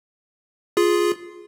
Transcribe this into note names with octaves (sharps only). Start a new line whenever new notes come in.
F4 G#4